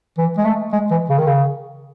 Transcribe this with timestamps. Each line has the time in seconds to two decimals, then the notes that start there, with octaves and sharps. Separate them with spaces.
0.18 E3
0.38 G#3
0.45 A3
0.73 G#3
0.91 E3
1.09 C#3
1.18 D#3
1.27 C#3